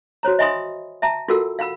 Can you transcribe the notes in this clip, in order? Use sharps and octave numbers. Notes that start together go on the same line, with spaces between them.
F#4 C5 C#5 A#5
D#5 E5 G#5 B5 C6 D#6
E5 A5 A#5
F4 F#4 A4 A#4 F#5 E6
F5 F#5 B5 E6